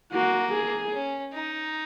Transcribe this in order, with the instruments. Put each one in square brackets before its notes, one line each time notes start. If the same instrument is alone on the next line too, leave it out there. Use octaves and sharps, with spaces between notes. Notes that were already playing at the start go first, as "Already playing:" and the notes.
[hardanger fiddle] A#3 [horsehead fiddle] F#4
[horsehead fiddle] G#4
[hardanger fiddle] C#4
D#4